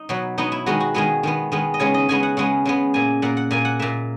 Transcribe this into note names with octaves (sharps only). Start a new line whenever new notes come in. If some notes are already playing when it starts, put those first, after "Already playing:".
Already playing: D#4
B2 F#3 B3
B2 F#3 B3 D#4
E4
D#3 G#3 B3 F#4
F#4
D#3 G#3 B3 G#4
D#3 G#3 B3
D#3 G#3 B3
D#5
C#3 G#3 B3 C#5
D#5
C#3 G#3 B3 G#5
F#5
C#3 G#3 B3 F#5
C#3 G#3 B3
A#2 A#3 G#5
A#2 A#3 F#5
F#5
A#2 A#3 G#5
F#5
A#2 A#3 E5